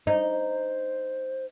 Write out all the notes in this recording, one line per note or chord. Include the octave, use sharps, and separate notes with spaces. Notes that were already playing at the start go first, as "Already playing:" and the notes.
D#4 C5